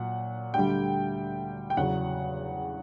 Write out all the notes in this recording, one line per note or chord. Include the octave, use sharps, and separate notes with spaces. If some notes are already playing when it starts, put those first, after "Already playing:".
Already playing: A#2 F#3 F#5
D2 D3 G3 G5
G5
E2 C#3 F#3 F#5